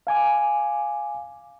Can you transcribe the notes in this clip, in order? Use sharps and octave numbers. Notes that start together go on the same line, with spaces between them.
F5 G#5 D6